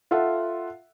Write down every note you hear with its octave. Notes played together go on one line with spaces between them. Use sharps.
F4 A4 E5 F#5